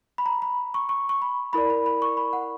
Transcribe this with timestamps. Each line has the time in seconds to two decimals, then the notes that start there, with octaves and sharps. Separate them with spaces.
0.18 B5
0.26 A#5
0.42 B5
0.74 C#6
0.89 C#6
1.09 C#6
1.22 B5
1.53 E4 A#4 D5 B5
1.70 B5
1.86 B5
2.02 C#6
2.17 B5
2.33 F#5